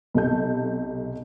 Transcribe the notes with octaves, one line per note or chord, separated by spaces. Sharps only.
B1 C3 A4 G6